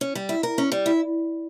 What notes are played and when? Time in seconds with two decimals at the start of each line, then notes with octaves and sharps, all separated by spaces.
0.01 C#4
0.15 G3
0.29 E4
0.43 A#4
0.58 C#4
0.72 G3
0.86 E4